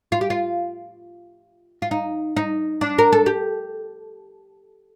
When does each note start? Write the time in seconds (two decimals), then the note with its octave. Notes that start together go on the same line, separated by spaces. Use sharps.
0.12 F4
0.21 G4
0.30 F4
1.82 F4
1.91 D#4
2.37 D#4
2.81 D4
2.98 A#4
3.12 A4
3.26 G4